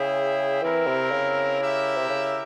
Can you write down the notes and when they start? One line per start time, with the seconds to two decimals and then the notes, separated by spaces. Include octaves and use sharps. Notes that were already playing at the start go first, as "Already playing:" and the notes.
Already playing: C#3 E4 G#4 E5 G5
0.62 E3 C4 E4 A#4
0.87 C3
1.11 C#3
1.61 E4 G4 A#4 E5
1.98 C3
2.09 C#3